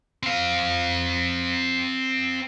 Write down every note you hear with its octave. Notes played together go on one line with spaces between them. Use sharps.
C4 F5